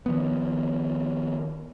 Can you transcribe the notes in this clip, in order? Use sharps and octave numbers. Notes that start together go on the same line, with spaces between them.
D#3 F3 B3